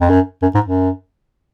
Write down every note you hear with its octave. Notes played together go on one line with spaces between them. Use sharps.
F2
F#2
F#2
G#2
F#2